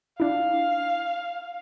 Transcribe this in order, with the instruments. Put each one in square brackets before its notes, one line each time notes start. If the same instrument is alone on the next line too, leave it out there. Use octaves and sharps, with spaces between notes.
[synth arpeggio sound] D4 E4 [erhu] F5